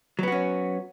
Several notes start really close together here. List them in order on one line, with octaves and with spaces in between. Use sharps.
F#3 B3 F#4 C#4